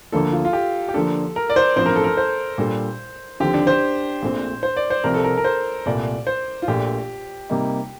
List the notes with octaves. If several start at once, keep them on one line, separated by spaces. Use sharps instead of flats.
D2 D3 F3 A#3 D4 A4
F4
F4
G4
G4
D3 F3 A#3 D4 A4
A#4
D5
C5
A1 G2 F3 C4 C5
A#4
A4
A#4
C5
A#2 G3 D4 A4
D#2 D3 F3 C4 G4
D4
C5
A#1 A#2 A3 C4
C5
D5
C5
C2 C3 F3 C4 A#4
A4
A#4
A#4
C5
C2 A#2 A3 D5
C5
F4
A#1 A#2 A3 G4
C3 G3 A#3 D#4